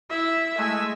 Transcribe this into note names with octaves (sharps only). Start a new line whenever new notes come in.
E4 E5
G#3 A3 G#5 E6 G#6